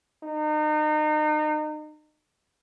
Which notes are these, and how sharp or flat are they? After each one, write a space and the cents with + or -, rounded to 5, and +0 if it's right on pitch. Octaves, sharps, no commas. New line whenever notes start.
D#4 -35